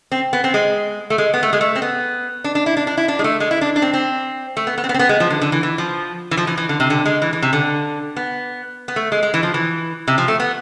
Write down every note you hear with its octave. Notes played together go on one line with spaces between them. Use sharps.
C4
B3
C4
G#3
A3
G#3
B3
A3
G#3
A3
C4
B3
D4
D4
E4
D4
D4
E4
D4
G#3
A3
G#3
E4
D4
D4
C4
C4
A3
B3
B3
C4
B3
C4
B3
G#3
F3
D3
D3
E3
E3
F3
E3
F3
E3
E3
D3
C3
D3
G#3
E3
E3
C3
D3
B3
B3
A3
G#3
G#3
E3
F3
E3
C3
F3
A3
B3